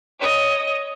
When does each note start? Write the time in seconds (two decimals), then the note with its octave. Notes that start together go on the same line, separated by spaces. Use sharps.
0.19 C#5 D#5